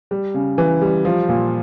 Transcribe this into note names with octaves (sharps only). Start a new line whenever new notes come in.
G3
C#3
E3
G3
F3
A#2